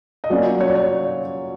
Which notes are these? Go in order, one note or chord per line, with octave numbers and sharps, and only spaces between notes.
D#5
F#3 A#3 C#4 F4 D5
C#5
D5
C#5